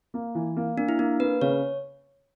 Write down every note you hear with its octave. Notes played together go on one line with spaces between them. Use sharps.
A#3
E3
A#3
A#3 D4
E4
A#3 D4
A#3 B4
C#3 C#5